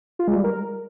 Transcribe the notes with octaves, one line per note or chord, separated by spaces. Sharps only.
F4
G#3
G3
A#4